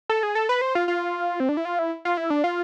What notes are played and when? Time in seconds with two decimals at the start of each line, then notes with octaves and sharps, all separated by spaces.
0.09 A4
0.23 G#4
0.35 A4
0.49 B4
0.61 C5
0.75 F4
0.88 F4
1.40 C4
1.49 D4
1.57 E4
1.65 F4
1.79 E4
2.05 F4
2.17 E4
2.30 D4
2.44 F4